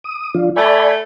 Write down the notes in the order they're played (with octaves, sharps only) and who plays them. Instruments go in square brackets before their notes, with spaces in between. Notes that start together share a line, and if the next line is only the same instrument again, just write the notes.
[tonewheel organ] D#6
F3 D4 F4
[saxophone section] A3 [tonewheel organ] D5 G#5 B5